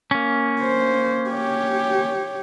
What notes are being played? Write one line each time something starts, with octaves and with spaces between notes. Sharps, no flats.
A#3 C#4
C5
G4 C#5